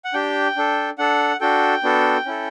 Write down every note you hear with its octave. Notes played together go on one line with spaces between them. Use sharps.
F#5
D4 G4 G5
D4 A4
D4 A4 F#5
D4 F#4 A4 G5
B3 D4 F#4 A4
C#4 E4 A4